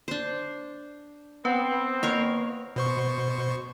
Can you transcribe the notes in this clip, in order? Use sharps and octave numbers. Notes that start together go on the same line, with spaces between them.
D4 C5
B3 C4 B4
A#3 A#4 C#5 F5
B2 C5 C#6